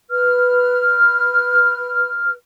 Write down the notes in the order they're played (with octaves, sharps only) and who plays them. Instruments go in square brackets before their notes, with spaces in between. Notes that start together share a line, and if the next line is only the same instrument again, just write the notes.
[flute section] B4 F6